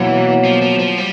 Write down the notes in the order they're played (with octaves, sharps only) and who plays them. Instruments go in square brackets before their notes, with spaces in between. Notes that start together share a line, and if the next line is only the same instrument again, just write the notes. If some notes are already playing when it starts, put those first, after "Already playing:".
Already playing: [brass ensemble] B2 F#3 A#3 [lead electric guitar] E3
[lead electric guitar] F3
F3
F3
G3